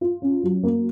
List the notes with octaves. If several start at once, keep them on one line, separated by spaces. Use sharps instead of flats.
F4
C#4
F#3
A#3